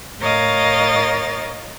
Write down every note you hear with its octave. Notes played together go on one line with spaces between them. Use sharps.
A2 A#4 C#5 D#5 F5 A6